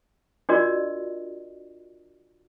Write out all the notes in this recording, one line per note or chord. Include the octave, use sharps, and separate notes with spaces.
D4 F4 F#4 A#4 D5 D#5